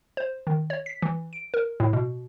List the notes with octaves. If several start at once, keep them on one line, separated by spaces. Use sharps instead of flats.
C5
D#3
C#5
B6
E3
D7
A#4
A2
B2